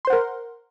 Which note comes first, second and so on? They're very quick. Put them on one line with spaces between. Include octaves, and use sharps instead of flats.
C6 C5 F#5 A#4